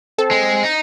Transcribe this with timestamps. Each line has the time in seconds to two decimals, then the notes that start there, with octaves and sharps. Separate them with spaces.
0.19 C4 A4
0.31 G#3
0.64 D#4